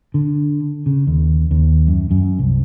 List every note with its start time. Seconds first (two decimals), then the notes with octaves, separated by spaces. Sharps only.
0.14 D3
0.86 C#3
1.07 D#2
1.51 D#2
1.87 F#2
2.11 F#2
2.39 C2